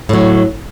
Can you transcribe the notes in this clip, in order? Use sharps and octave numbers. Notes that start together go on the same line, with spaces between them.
A2 F#3